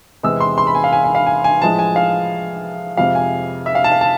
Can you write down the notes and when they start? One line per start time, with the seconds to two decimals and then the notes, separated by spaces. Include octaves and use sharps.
0.23 E2 C3 G#3 E6
0.41 C6
0.58 C6
0.67 B5
0.75 G#5
0.84 F5
0.93 G#5
1.04 G#5
1.15 F5
1.26 G#5
1.44 G#5
1.61 A2 F3 G#3 A5
1.79 G#5
1.96 F5
2.97 F2 C3 G#3 F5
3.15 G#5
3.66 E5
3.75 F5
3.84 A5
3.92 F5
4.01 A5